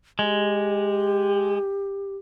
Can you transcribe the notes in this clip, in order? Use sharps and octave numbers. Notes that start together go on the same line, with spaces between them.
G#3 G4